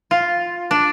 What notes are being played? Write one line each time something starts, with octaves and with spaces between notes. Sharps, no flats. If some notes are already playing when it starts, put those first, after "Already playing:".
F4
D4